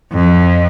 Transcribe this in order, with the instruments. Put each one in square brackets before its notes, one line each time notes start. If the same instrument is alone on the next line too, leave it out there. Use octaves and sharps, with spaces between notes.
[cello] F2